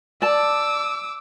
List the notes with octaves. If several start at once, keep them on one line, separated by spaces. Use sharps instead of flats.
D5 A5 D6 E6